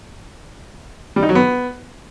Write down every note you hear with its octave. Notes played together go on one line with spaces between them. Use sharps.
G3
D#4
F#3
B3